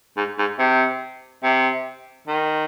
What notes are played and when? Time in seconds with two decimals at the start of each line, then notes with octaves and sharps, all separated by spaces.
0.17 G#2
0.39 G#2
0.59 C3
1.44 C3
2.28 D#3